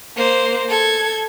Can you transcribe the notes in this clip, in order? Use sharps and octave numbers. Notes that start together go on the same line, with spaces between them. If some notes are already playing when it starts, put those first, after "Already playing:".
A#3 C5
A4 G#6